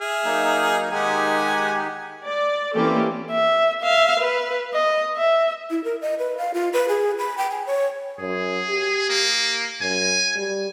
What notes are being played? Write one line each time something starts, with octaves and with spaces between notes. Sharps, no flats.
G#4 E5 F6
F#3 A#3 D#4
D#3 G#3 D#4 G4 F#5 G#5
D5
E3 A#3 C4 C#4 G4 A4
E5
E5 F5
B4
D#5
E5
E4
A#4
D#5
B4
F5
F4
B4
G#4
B5
G5
G#5
C#5
F#2 G#4
G4
A#3
F#2 G#5
G3